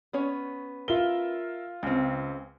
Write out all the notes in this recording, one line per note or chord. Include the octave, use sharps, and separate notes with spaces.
B3 C#4 C#5
F4 A#4 E5 G7
C#2 C#3 C4